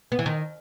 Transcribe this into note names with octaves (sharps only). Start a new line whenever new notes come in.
B3
E3
D#3